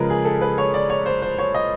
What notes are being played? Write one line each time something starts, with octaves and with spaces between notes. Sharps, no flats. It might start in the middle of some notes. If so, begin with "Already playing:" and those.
Already playing: C#3 F3 G#3 A#4 B4
G#4
A4
B4
C#5
D5
C#5
C5
C5
C#5
D#5